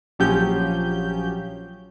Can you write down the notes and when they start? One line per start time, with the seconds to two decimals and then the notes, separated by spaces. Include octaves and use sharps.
0.19 A#1 F3 F#3 C#4 G4 G6